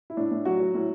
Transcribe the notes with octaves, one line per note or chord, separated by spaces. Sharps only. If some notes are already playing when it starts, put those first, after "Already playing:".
E4
A2 D4
A2
F#3 F#4
F#3
A2